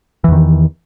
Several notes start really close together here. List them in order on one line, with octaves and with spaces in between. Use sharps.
E3 E2 D#3